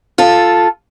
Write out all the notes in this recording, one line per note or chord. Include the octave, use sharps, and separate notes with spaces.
F4 A4